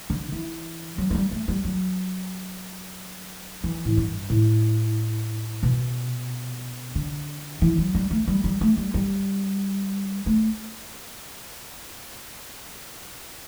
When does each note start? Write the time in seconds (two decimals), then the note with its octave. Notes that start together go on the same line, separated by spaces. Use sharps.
0.10 D3
0.32 E3
0.98 F#3
1.10 A3
1.15 G3
1.31 A3
1.48 G3
1.65 F#3
3.64 E3
3.85 A2
3.97 G2
4.30 A2
5.63 B2
6.95 D3
7.62 E3
7.78 F#3
7.95 G3
8.11 A3
8.28 G3
8.44 G3
8.61 A3
8.77 G3
8.94 G3
10.26 A3